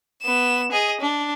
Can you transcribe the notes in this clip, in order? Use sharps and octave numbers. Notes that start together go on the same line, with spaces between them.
B3 E7
G#4 D#5
D4